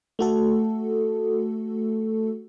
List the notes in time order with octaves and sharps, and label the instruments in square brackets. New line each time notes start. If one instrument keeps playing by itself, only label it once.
[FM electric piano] A3 F#4 A4